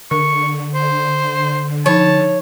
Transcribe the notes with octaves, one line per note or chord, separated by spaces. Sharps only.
D3 A#4 C#6
C5
F3 D#4 C#5 A5